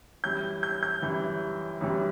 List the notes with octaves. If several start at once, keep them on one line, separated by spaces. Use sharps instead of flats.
F#2 E3 G3 G6
G6
G6
F#2 E3 G3
F#2 E3 G3